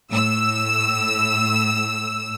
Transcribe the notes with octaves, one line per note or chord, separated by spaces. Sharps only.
A2 E6